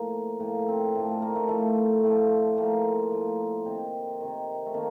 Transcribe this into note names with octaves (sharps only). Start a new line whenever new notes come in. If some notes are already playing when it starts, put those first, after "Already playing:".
Already playing: A2 F3 A#3
A2 F3 A#3
C4
A2 F3 D4
A#3
A#3
A3
A2 F3 A3
A2 F3
A2 F3 A#3
A2 F3
C3 D#3 C4
C3 D#3
A3
C3 D#3 A#3